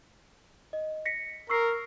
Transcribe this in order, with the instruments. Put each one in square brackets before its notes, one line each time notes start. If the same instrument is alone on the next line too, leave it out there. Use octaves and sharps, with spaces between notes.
[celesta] D#5
A#6 B6 C#7
[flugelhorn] A#4 [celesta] C#6 E6 C7